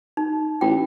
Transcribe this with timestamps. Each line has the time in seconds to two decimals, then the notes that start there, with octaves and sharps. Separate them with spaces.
0.17 D#4
0.61 A1 F4 G5